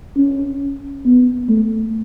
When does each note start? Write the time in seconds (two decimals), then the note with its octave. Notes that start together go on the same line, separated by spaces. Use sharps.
0.17 C#4
1.05 B3
1.49 A3